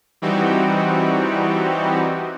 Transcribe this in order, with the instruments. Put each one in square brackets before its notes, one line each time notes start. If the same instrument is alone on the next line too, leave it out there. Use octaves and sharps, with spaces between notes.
[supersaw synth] E3 G3 C4 D#4 F#4 G4